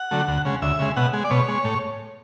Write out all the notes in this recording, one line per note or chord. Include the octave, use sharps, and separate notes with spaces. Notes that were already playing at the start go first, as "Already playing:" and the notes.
Already playing: F#5
D3 F#3 A3
D2
C#3 G#3
D2 E5
C#3 G#3
B2 F#5
G#3
D5
B2 C#5
G#3
A2